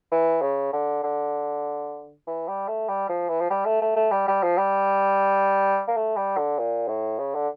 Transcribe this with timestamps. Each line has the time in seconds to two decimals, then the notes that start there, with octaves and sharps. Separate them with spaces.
0.12 E3
0.42 C#3
0.73 D3
1.03 D3
2.27 E3
2.48 G3
2.68 A3
2.89 G3
3.09 F3
3.29 E3
3.41 F3
3.50 G3
3.65 A3
3.82 A3
3.96 A3
4.11 G3
4.28 G3
4.43 F3
4.58 G3
5.88 A#3
5.97 A3
6.17 G3
6.38 D3
6.59 A#2
6.88 A2
7.19 C#3
7.35 D3